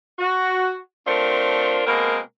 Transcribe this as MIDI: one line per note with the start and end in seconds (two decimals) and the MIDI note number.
0.19 0.77 66
1.06 1.82 57
1.06 1.82 60
1.06 1.82 62
1.06 1.82 65
1.06 1.82 70
1.06 1.82 72
1.87 2.18 47
1.87 2.18 56
1.87 2.18 58
1.87 2.18 60
1.87 2.18 70